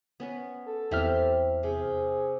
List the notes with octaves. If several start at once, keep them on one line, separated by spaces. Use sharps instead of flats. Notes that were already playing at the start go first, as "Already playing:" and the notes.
B3 C#4 B4
A4
E2 C4 E4 G4 E5 F6
C3 G#4